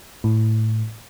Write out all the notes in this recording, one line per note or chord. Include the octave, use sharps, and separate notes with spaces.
A2